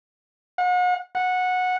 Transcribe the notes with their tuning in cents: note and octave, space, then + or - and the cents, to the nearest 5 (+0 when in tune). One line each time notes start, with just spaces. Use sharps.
F#5 -40
F#5 -15